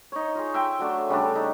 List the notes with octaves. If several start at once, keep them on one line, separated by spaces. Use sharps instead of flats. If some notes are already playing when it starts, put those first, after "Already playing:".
D#4 C#5
F4 G#4
E5 G5 C6
F#3 A3 D4
C#3 G3 A3 D4
D#4